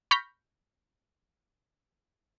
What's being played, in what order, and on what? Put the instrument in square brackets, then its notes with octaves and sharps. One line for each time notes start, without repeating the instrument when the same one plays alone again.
[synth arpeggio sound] B5 C#6 F6 G6 A#6 B6